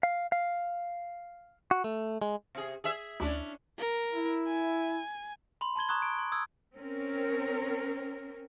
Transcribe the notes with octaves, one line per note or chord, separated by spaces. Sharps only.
F5
F5
F#4
A3
G#3
C3 G#4
G#4 E5
D2 C#4 D4 E4
A#4
E4
G#5
B5 C6
A5 C6 G#6 G7
A#5 C#6 D#6 F#6 G#6
D7
C6
D#6 E6 G#6
C4 C#4 A#4